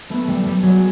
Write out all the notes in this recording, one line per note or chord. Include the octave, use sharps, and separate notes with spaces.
A3 B3
G3 A3
G3
F#3 G#3